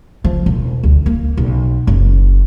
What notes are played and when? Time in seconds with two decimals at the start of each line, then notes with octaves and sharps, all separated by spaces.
0.24 F3
0.46 E1
0.83 D2
1.06 A#3
1.37 B1
1.87 F#1